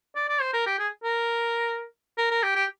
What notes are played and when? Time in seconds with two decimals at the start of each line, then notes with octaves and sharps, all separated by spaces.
0.16 D5
0.28 D5
0.41 C5
0.53 A#4
0.66 G4
0.79 G#4
1.04 A#4
2.18 A#4
2.31 A#4
2.43 G4
2.56 G4